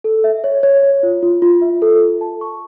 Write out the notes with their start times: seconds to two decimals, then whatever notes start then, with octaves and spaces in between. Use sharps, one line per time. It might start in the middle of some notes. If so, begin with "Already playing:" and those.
0.04 A4
0.24 E5
0.44 C#5
0.63 C#5
0.83 C#5
1.03 F4
1.23 F4
1.42 F4
1.62 E5
1.82 A4
2.01 A4
2.21 A5
2.41 C#6